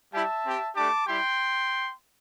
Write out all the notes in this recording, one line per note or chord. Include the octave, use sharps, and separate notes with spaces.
G3 E4 G4 E5 A5
C4 G4
A3 D4 G4 A5 D6
G3 E4 G4 G5 C6